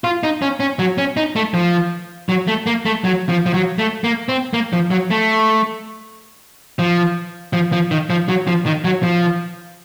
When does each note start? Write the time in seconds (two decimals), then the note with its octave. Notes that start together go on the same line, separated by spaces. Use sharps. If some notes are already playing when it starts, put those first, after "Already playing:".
0.04 F4
0.23 D#4
0.42 C#4
0.60 C#4
0.79 F#3
0.98 C#4
1.17 D#4
1.36 A3
1.54 F3
2.29 F#3
2.48 A3
2.66 A#3
2.86 A3
3.04 F#3
3.29 F3
3.46 F3
3.54 F#3
3.78 A3
4.04 A#3
4.29 C4
4.53 A#3
4.73 F3
4.91 F#3
5.10 A3
6.79 F3
7.53 F3
7.72 F3
7.91 D#3
8.10 F3
8.28 F#3
8.47 F3
8.66 D#3
8.84 F#3
9.03 F3